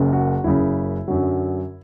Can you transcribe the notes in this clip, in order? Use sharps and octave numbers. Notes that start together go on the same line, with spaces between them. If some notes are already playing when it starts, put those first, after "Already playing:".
Already playing: F#1 F#2 C#3
F#4
F#1 F#2 C#3 E4
F#2 D3 F#3